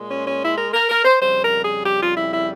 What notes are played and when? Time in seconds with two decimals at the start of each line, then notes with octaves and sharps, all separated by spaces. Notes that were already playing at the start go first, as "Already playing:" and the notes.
Already playing: A#2 G#3
0.08 C#4
0.25 C#4
0.41 E4
0.56 A#4
0.73 A#4
0.89 A#4
1.04 C5
1.20 F2 C#3 G3 C5
1.42 A#4
1.63 G#4
1.84 G4
2.00 F4
2.16 E4
2.32 E4